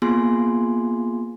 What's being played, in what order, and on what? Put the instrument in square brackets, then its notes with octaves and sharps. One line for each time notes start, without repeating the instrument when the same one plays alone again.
[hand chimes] A#3 B3 F4 G#4 G#5 C6